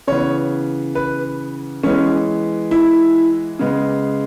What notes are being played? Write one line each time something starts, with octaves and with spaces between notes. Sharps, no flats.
C#3 E3 B3 C#5
B4
E3 G#3 B3 C#4
E4
C#3 G#3 B3